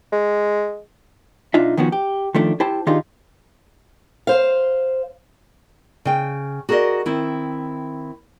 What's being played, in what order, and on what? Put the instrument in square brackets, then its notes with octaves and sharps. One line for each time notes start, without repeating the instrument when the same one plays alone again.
[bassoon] G#3
[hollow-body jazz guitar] B1 D4 D#4 F4 E5
D#3 F3 B3 C#4 F#4
G4
D#3 F3 A3 D4
E4 G4 C5 G5 A5
D#3 D4 D#4 F4 G4 G#4
[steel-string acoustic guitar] C5 F5
[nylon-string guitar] C#3 G5
F#4 G#4 A#4 D5 D#5
D#3 C4 E4